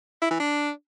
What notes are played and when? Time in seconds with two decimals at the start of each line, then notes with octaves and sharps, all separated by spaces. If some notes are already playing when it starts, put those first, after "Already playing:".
0.22 E4
0.31 E3
0.40 D4